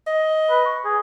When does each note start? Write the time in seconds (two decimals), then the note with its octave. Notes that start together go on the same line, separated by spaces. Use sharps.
0.07 D#5
0.50 B4
0.66 C#6
0.85 G#4